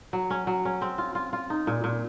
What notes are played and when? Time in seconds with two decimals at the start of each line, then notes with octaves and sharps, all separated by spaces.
0.13 F#3
0.30 C#4
0.47 F#3
0.65 C#4
0.82 C4
0.98 F4
1.15 F4
1.33 F4
1.50 D#4
1.67 A#2
1.84 A#2